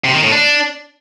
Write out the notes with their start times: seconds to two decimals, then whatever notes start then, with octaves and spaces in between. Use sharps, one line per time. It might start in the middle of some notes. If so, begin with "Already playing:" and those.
0.04 C3
0.13 D#3
0.23 A2
0.32 D4